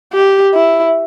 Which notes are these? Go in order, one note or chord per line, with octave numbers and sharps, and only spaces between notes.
G4
E4